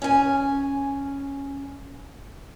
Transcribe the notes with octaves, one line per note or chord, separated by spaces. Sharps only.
C#4 G#5